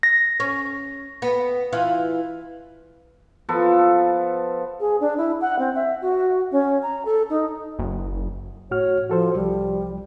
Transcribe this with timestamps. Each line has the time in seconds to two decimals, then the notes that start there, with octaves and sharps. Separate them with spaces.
0.03 A#6
0.40 C#4
1.22 B3
1.73 E3 F4
3.49 F3 B3 A4
4.80 G#4
5.00 D4
5.17 E4
5.41 F#5
5.59 C4
5.75 E5
6.02 F#4
6.52 C#4
6.83 A#5
7.05 A4
7.30 D#4
7.79 F#1
8.71 A2 F#4 C#5 F6
9.10 F3 F#4 A4 C5
9.35 C2 F3 G3